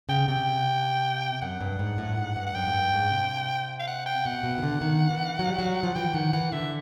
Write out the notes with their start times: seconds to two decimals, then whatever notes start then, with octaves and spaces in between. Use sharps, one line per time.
0.09 C#3 G5
0.28 C3 G5
1.42 F#2 F#5
1.61 G2
1.79 G#2
1.98 A2
2.09 G2
2.17 G#2
2.36 G2
2.46 F#5
2.55 F#2 G5
2.67 G#2
2.74 G2
2.93 G#2
3.11 C3
3.80 F5
3.87 F#5
4.06 G5
4.25 B2 F#5
4.44 B2
4.58 D#3
4.63 D3
4.81 D#3
5.10 E3
5.39 F#3
5.49 G3
5.59 F#3
5.83 F3
5.95 E3 G5
6.14 D#3 F#5
6.33 E3 F#5
6.52 D3 E5